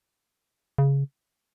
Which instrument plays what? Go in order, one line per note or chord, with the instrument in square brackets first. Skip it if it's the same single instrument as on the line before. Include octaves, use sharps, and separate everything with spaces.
[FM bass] C#3